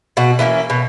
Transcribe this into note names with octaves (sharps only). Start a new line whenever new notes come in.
B2 F#4
E3 A3 A#3 C#4
B2